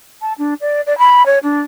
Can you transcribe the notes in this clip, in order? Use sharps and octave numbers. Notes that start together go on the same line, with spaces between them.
A5
D4
D5
D5
B5
C#5
D4